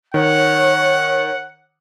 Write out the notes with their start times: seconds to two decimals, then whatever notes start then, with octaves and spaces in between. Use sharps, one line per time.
0.14 D#3 C#5 F#5